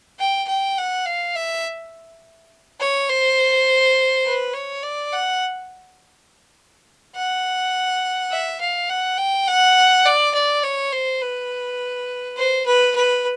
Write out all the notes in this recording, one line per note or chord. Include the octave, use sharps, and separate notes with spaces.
G5
G5
F#5
F5
E5
C#5
C5
B4
C#5
D5
F#5
F#5
E5
F5
F#5
G5
F#5
D5
D5
C#5
C5
B4
C5
B4
B4